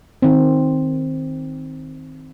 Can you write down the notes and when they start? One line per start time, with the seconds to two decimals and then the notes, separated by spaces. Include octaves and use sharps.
0.22 D#3 C4